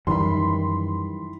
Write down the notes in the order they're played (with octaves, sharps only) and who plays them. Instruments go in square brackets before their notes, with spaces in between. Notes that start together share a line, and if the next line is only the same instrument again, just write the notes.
[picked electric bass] F#2 [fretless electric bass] D#3 E3 G3 [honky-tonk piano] B5 C6